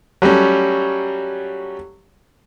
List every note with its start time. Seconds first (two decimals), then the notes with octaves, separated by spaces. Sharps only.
0.22 F#3 G3 A3 C#4